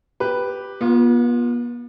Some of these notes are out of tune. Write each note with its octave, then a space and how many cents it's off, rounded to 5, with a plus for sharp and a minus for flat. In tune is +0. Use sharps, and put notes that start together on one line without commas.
G4 +0 B4 +0
B3 -40 F4 +10